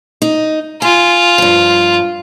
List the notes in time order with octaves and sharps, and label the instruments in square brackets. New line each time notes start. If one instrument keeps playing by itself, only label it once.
[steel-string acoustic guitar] D#4
[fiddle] F4 [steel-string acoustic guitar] G#5
[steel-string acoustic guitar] G2 F3